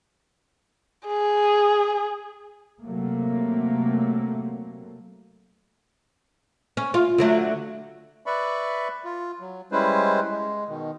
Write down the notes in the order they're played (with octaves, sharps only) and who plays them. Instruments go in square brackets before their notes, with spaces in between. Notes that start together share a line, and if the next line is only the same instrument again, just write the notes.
[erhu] G#4
[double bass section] C3 F#3 A3 A#3
[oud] C#4
F4
D3 F#3 A3
[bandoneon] B4 D5 E5 B5 C#6
F4
F#3
G3 G#3 C#4 E4 B4 C5
G#3
B2 D#3